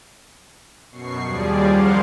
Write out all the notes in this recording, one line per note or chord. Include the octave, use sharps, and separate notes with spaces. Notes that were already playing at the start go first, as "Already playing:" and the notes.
F#2 B2 C#6 C7
D#2 F3 G3 G#4 D5
C#4 A#4 C5 F5 F#5 C6